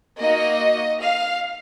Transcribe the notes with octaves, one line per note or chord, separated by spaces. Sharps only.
A#3 D#4 F#4 D#5
F5